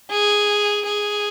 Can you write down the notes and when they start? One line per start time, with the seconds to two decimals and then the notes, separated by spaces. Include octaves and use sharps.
0.11 G#4
0.86 G#4